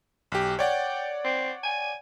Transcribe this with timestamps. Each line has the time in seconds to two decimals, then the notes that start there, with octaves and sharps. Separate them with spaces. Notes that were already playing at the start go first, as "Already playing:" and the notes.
0.32 B1 G4
0.59 C#5 D5 F#5 G5
1.24 C4
1.63 G#5